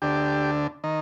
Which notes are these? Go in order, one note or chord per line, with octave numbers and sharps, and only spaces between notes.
D2 D3 G4
D#3